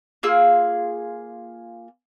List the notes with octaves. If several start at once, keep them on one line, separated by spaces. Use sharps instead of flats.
A#3 F4 G#4 E6